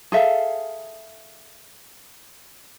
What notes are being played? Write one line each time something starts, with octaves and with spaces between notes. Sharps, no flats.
G#4 A4 E5 F5